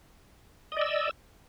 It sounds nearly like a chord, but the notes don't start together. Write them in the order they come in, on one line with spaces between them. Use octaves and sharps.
D#5 D5 E6